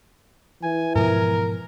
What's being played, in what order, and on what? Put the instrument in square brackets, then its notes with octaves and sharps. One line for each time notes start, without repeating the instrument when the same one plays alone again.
[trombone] E3 [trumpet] G#5
[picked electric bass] G#2 B2 F3 [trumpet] A#4